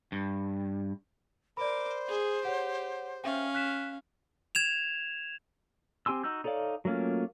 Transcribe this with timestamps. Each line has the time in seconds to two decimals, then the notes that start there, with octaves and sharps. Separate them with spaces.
0.12 G2
1.57 A#4 C5 D5 B5 D6
2.08 G#4
2.45 G4 C#5 F#5
3.24 C#4 E5 F5 G5
3.55 F#6 B6 E7
4.55 G#6 E7 F7
6.06 C4 G4 G#5 C6 E6
6.24 D#4 F#4 E6 G6
6.44 D#4 A4 C#5 D5 F5
6.85 F#3 A3 A#3 C#4 F4